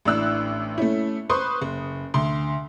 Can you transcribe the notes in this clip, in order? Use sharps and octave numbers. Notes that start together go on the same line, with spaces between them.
A1 A2 D4 E6 F#6
A3 C#4 E4
B4 C5 C6 C#6 D#6
F#1
D2 C6